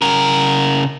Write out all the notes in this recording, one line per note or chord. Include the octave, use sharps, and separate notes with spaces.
C#3 A#4